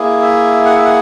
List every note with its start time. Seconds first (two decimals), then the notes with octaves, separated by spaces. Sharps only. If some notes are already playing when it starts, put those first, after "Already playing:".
Already playing: A#3 E4 G#4
0.22 E5
0.65 F#5
0.75 E5
0.85 F#5